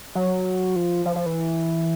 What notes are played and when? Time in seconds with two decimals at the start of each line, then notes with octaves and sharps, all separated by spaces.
0.15 F#3
0.76 F3
1.06 F3
1.16 F3
1.26 E3